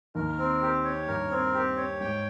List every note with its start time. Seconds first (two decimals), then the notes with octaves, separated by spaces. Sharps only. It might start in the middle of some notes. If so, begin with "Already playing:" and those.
0.15 D#2 D#3 A#4
0.38 C4
0.62 G4
0.85 C#5
1.07 G2 A#4
1.31 C4
1.54 G4
1.77 C#5
2.00 G#2 G5